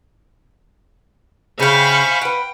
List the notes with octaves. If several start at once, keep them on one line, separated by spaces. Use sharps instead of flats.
C#3 C5 E5 F5 G5 G#5 B5 C#6
B4 F#5 G5